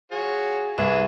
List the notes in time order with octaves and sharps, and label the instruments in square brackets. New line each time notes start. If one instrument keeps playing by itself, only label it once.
[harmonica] F4 F#4 C#5 [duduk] G#4
[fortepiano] C2 [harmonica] E3 G#4 [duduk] B4 [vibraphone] E5